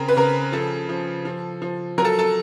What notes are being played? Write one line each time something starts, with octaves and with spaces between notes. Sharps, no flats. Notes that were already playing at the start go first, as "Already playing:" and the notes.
Already playing: C#3 C4 A#4
B4
C#3 A#4
F3 A4
F3
F3
F3
F#3 A#4
A4
A4